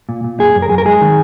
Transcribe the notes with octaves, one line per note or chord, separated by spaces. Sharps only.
A#2
A#2
F#2 G#4
F#2
A#4
F#2 G#4
A#4
G#3 G#4
D#3